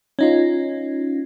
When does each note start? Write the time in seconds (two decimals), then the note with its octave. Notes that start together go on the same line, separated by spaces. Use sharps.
0.19 C#4 D#4 F4